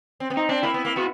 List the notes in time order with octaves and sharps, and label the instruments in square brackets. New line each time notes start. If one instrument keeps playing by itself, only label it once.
[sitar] C4
B3
[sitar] C4 [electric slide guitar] D#4
[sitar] C4 [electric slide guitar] D4
[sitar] A#3 [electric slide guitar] E4
[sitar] B3
A#3
[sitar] B3 [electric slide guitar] F#4